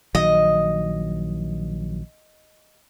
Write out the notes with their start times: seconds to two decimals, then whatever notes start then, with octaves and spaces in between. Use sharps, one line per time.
0.15 A#1 D#3 F#3 D#5